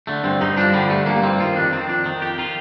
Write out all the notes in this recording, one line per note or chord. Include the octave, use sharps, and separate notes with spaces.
D3 A3
G2 C4
G2 D#4
F3 D4
D3 G3
G2 A3
G2 A#3
F3 C4
D#3 F4
F2 D4
D#3 C4
F2 D4
D#3
F2 G4
D#3 F4